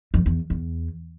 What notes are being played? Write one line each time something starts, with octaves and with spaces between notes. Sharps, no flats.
F2
E2
E2